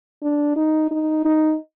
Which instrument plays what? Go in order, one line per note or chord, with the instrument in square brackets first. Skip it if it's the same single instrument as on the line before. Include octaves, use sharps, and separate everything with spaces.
[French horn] D4
D#4
D#4
D#4